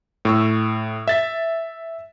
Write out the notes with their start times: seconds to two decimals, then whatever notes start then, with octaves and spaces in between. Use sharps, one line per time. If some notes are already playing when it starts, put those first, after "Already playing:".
0.25 A2 C#6 E6
1.08 E5 A6 B6